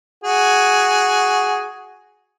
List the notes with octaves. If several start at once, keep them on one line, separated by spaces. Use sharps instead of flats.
F#4 G#4